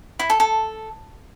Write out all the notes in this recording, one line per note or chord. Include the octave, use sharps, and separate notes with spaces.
E4
A4
A4